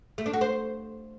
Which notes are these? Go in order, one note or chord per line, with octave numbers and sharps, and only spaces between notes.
A3
D4
F#4
C5